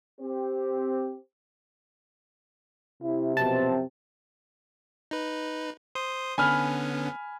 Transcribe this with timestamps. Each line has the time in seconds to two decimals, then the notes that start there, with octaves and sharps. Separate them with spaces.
0.21 C4 G4 C5
3.02 C3 E4
3.37 F#2 B2 F3 C4 A5
5.11 D#4 B4
5.95 C5 C6 D#6
6.38 D3 B3 C#4 G#5 B5 F6